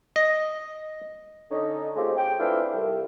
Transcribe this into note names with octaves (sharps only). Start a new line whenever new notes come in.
D#5
D3 C#4 D#4
C#3 G#3 A3 C4 F4 G4
G5
E3 A3 C4 D4 E4 F4
C2